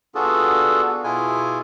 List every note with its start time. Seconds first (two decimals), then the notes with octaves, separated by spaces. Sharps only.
0.15 B3 D4 F4 F#4 G#4 A4
1.04 B2 E4 F4 G#4 G#5